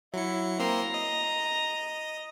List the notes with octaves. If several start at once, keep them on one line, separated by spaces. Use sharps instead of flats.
F#3 E4 C#7
A#3 C4 A#5 C6
D#5